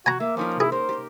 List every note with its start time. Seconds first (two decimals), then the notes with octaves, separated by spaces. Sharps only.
0.06 F#4 G#5 A#5
0.20 A#3 E5
0.37 F3 C#4 D#4 A#4
0.60 E4 G#4
0.72 A#4 C5
0.89 G4